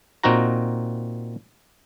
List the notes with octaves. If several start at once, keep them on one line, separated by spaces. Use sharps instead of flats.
A#2 C4 D#4 F#4 A#5